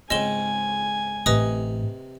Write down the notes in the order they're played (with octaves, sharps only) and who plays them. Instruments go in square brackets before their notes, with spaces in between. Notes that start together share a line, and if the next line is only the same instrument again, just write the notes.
[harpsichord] G#2 C#3 C4 [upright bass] F4 [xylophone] D#5 E7 G7 [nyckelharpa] G#5
[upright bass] A1 A2 [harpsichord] C3 A#5 [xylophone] B4 D#5 D#6